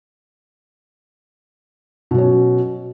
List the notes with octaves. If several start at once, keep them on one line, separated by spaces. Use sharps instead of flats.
B2 F#3 C#4